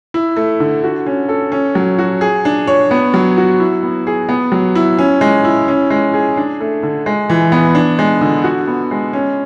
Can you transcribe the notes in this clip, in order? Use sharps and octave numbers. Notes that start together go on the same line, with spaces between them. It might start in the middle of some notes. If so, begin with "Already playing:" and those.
E4
A3
D3
F#4
C#4
A4
C#4
F#3
F#4
G#4
D4
C#5
B3
F#3
F#4
E4
B3
G#4
B3
F#3
E4
C#4
G#3
E4
C#4
G#3
G#4
D4
A3
D3
G#3
E3
B3
D4
G#3
D3
F#4
B3
G#3
C#4